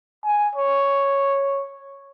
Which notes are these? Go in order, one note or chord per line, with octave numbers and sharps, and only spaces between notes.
G#5
C#5